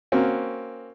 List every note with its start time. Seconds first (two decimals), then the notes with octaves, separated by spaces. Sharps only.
0.12 A#3 C4 C#4 F#4